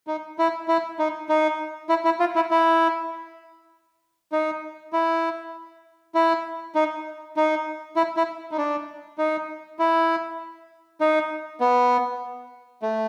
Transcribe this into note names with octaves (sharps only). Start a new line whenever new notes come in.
D#4
E4
E4
D#4
D#4
E4
E4
F4
E4
E4
D#4
E4
E4
D#4
D#4
E4
E4
D#4
D4
D#4
E4
D#4
B3
A3